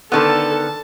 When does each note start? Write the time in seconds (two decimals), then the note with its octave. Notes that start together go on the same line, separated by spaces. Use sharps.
0.12 D3 D#3 B3 A4 A5